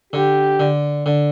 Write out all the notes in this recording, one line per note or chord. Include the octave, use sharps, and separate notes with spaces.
D3 G4
D3
D3